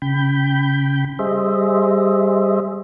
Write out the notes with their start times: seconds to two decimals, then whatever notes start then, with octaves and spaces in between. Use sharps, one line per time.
0.02 C#3 G5 B5 G6
1.19 G3 G#4 C5 D#5 E5